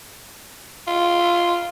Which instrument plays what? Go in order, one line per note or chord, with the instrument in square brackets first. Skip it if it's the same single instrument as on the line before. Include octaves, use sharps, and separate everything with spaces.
[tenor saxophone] F4